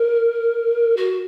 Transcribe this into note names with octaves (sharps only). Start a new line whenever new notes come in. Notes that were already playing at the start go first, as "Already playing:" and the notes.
Already playing: A#4
F#4